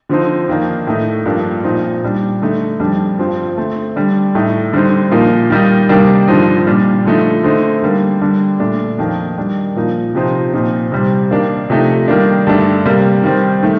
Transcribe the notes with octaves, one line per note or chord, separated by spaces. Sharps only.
D3 F3 C4 D#4
F2 D#3 A#3 D4
A2 A3 D#4
G2 F3 A#3 D4
A#2 F3 C4 D#4
A#2 G3 D4
D3 A3 D#4
F2 D3 G3 D4
G2 F3 C4
D3 A3 C4
D3 G3 D4
A2 A3 D#4
D3 G3 C4 D#4
A#2 F3 A#3 D#4
D#3 G3 A#3 D#4
C3 D#3 G3 A#3 D4
G2 D3 F3 C4 D#4
A#2 G3 D4
D3 F3 A3 D#4
D3 A3 C4 D#4
D3 G3 A#3
D3 G3 D4
A#2 A3 D4
F2 D#3 A#3 D4
D#3 G3 D4
A#2 F3 A#3 D#4
C3 F3 C4 D#4
A#2 F3 C4 D#4
C3 G3 C4
D#3 A#3 D4
C3 F3 A3 D#4
D#3 G3 A#3 D4
G2 D3 A3 D4
C3 G3 A#3
D#3 G3 C4
D#3 A3